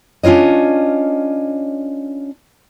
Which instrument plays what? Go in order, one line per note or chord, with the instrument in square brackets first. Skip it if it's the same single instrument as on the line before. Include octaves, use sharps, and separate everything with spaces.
[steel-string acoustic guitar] C#4 D4 F4 C#5 D#5